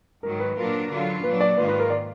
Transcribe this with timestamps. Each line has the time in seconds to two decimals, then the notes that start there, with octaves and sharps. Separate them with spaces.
0.23 G#2 D#3 F#3 A#4
0.40 B4
0.57 A#2 F#3 D4 F4 A#4
0.90 D3 F#3 D4 F4
1.23 A#2 F#3 D4 B4
1.41 D5
1.57 G#2 D#3 A#3 F4 B4
1.68 B4
1.79 A#4
1.90 D5